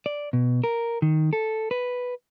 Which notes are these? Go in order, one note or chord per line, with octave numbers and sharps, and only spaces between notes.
D5
B2
A#4
D#3
A4
B4